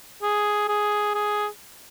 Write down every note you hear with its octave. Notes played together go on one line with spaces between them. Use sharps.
G#4
G#4
G#4